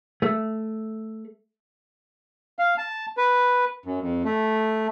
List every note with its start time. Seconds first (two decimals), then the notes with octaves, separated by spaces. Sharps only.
0.22 A3
2.59 F5
2.78 A5
3.17 B4
3.86 F#2
4.01 F2
4.24 A3